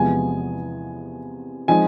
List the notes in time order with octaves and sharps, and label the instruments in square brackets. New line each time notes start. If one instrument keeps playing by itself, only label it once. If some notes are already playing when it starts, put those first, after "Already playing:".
Already playing: [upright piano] E2 C3 F3 G#3 B3 G#5
F3 G#3 C4 D#4 G#5